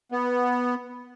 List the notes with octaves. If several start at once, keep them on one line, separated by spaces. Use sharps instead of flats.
B3